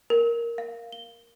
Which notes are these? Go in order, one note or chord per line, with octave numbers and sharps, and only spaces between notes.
A#4
F5
G7